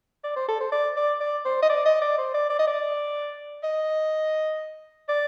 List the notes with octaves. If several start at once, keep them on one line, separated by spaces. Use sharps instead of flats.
D5
C5
A4
C5
D5
D5
D5
C5
D#5
D5
D#5
D5
C5
D5
D5
D#5
D5
D#5
D5